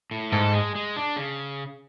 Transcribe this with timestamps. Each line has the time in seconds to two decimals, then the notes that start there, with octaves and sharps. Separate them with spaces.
0.11 A2
0.32 G#2 A4
0.53 G#3
0.75 G#3
0.96 D4
1.16 C#3